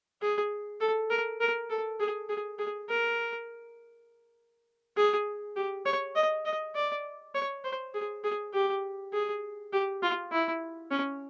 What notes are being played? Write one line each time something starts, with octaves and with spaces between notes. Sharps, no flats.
G#4
A4
A#4
A#4
A4
G#4
G#4
G#4
A#4
G#4
G4
C#5
D#5
D#5
D5
C#5
C5
G#4
G#4
G4
G#4
G4
F4
E4
C#4